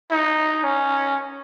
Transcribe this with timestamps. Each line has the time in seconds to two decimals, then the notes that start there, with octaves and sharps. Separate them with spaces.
0.11 D#4
0.64 C#4